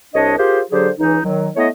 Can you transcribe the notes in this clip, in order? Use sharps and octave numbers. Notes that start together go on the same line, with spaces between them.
C2 D4 C#5 D#5
F4 G4 G#4 A#4 C5
D3 F#3 G4 G#4 C5
C#2 E3 D#4
D#3 F#3
A3 B3 E4 C#5 D#5